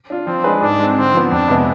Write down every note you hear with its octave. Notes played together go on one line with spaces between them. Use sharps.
D4 F4
F3 C4
G#3 D4 G#4 B4
G#2 D4
G#3
C4
D3 C4
F3 B3
F2 D4
C3 G#3 B3